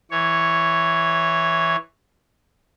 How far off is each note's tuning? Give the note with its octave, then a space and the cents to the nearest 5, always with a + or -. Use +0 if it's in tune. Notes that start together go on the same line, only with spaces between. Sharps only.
E3 +5 C#5 +0